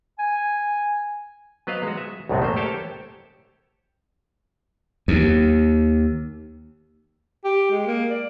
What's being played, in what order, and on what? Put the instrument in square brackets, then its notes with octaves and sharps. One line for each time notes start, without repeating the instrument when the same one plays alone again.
[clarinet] G#5
[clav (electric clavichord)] F#3 B3 B4 C5 D#5 F5
G#3 F#4
E5
C2 F#2 A2 G#3 B3 C4
A3 A#3 C5
G4 A4 C5 C#5 G5 A5
[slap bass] D#2
[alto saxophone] G4
G#3
A#3
D5